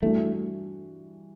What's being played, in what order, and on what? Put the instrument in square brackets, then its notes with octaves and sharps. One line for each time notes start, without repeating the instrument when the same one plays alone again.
[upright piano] G2 E3 G3 D4 F#4 [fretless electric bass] A3